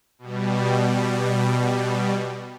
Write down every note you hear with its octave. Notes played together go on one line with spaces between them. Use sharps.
B2 G3